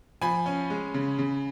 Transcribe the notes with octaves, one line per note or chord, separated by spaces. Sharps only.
F3 G#5 B5
C#4
G#3
C#3
C#3